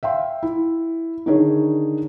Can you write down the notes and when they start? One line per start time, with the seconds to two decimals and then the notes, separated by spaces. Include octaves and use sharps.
0.03 E5 F5 G5 C6
0.43 E4
1.26 D3 D#3 D#4 G#4 C#5